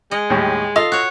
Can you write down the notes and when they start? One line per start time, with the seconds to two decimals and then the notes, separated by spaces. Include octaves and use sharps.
0.11 G#3 D#5
0.30 D#2 A2 G3
0.76 F4 A4 D#5 F5
0.92 F#4 C#5